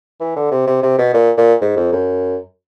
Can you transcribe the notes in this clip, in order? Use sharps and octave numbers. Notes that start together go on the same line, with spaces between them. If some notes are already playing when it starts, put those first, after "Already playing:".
E3
D3
C3
C3
C3
B2
A#2
A#2
G#2
F2
F#2